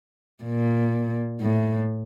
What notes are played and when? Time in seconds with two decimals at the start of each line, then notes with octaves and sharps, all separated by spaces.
0.44 A#2
1.42 A2